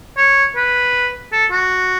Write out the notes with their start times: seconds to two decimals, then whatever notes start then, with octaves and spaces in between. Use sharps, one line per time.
0.17 C#5
0.56 B4
1.32 A4
1.51 F#4